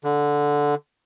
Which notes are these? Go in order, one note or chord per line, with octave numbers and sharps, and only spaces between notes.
D3